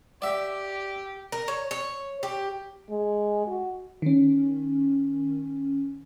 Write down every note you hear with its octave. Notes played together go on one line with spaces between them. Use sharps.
G4 D5 E5
A#4
C#5
C#5
G4
G#3
F#4
D#3 C#4